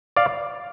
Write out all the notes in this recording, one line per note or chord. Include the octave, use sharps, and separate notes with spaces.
D5 F5